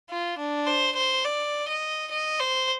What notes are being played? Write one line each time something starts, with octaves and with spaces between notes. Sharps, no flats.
F4
D4
C5
C5
D5
D#5
D#5
C5